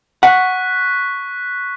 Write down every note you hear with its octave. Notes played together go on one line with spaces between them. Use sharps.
F#5 C#6 F#6 B6